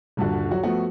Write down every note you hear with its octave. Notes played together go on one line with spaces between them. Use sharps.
D#1 G2 D3 F#4
F#3 F#4
F3 A3 B3 F#4